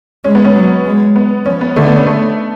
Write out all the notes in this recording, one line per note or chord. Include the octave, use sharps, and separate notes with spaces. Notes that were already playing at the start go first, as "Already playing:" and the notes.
G#3 C#4
B3
C#4
F#3
G#3
B3
F3 C#4
B3
D3 A3
B3
C#4
A3